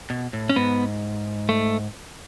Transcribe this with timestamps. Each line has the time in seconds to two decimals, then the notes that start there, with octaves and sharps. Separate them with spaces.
0.10 B2
0.33 A2
0.49 C#4
0.56 G#2 B3
1.49 A3